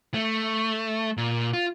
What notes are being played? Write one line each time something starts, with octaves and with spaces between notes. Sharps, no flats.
A3
A#2
F4